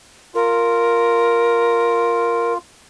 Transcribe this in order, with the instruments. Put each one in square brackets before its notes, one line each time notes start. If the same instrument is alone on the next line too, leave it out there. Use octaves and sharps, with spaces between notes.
[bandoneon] F4 [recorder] A#4